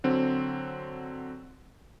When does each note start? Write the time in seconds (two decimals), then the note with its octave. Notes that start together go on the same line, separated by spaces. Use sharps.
0.04 D3 F#3 C4